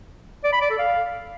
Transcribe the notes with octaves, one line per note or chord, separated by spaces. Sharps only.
D5
B5
D5
A4
F5